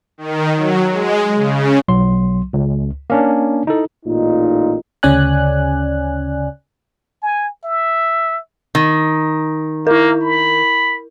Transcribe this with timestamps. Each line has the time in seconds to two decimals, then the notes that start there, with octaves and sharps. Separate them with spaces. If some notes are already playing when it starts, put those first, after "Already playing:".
0.18 D#3
0.56 F#3
0.91 G#3
1.36 C#3
1.88 B1 F#3 C6
2.53 C#2
3.10 A#3 C#4 D4
3.67 D#4 E4 A4
4.05 A1 A#2 D#4
5.03 D2 C#3 C#4 D5 G#5 F#6
7.22 G#5
7.64 E5
8.75 D#3
9.87 A#3 E4 A#4
10.21 B5